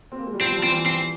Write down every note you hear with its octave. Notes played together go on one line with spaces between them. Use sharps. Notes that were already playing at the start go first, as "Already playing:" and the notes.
C4
A#3
G#3
G3
F3 C4
G3
F3
E3 C4
E3
F3 C4